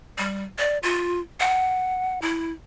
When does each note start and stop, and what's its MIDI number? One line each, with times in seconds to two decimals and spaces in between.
0.18 0.44 55
0.58 0.78 74
0.83 1.20 65
1.40 2.21 78
2.22 2.52 64